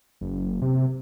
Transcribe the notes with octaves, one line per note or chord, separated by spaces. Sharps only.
F#1
C3